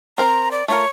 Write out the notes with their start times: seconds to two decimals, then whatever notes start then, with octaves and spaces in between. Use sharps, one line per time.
0.18 C4 A#4 C5 A#5
0.51 D5
0.68 A3 F4 A#4 C#5